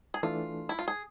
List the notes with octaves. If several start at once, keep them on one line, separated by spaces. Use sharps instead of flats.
G#4
E3 A3 D4 F4 A4
E4
F4
G#4